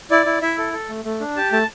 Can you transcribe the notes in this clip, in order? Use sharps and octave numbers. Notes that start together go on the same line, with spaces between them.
E4 D5
E4
E4 E5
A4
A4
A3
A3
D4
G4 A5
A3 A5